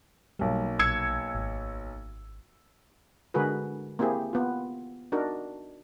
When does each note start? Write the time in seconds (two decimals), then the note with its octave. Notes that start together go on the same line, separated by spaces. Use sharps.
0.39 B1 G3 A#3
0.79 A#1 E6 G#6 C#7
1.35 G#1
3.34 D3 G#3 F#4 G#4 A#4 B4
3.99 A#3 C4 E4 G4 G#4
4.33 B3 F4
5.12 D4 D#4 F#4 A#4